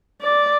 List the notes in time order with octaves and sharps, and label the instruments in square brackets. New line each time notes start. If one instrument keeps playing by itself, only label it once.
[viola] D5